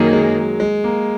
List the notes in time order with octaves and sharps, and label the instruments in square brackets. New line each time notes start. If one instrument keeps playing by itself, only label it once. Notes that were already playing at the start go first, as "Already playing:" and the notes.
Already playing: [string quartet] F#2 D#3 A#3 D#4 G#4 [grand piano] F#3
[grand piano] G#3
G#3
A#3